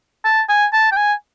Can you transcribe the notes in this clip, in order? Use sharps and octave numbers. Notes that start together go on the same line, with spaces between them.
A5
G#5
A5
G5
G#5